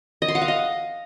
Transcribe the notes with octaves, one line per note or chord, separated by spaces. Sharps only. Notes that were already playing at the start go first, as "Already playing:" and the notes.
D#5
C6
F#5
F5
D#5